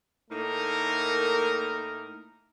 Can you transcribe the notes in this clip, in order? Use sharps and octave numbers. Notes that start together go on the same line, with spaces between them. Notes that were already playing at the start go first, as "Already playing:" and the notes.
A2 A3 A#3 D#4 A#4